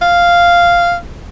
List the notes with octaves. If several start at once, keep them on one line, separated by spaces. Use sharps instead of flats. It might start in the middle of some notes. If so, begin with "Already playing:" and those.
F5